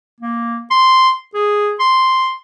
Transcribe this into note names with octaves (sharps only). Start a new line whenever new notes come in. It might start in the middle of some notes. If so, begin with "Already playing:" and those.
A#3
C6
G#4
C6